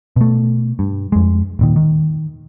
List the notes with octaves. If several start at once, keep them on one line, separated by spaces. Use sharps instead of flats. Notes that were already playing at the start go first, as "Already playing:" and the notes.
B2 A3
G2
F2 G#3
D#1 A#2 D#3
D#3